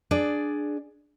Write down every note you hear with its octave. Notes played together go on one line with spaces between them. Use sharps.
D4 G#4 D5